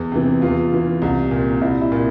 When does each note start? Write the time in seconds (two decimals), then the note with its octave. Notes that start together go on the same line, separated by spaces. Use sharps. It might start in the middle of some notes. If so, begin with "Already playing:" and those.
Already playing: E2
0.12 C3 E3
0.42 E2 F4
0.71 C#3 E3
1.02 C2
1.31 A#2
1.61 C2 E4
1.81 E4
1.92 A#2